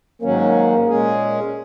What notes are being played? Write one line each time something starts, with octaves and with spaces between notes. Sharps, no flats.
G#2 D#3 F#3 A#3 C#4
A#2 G#3 C#4 G#4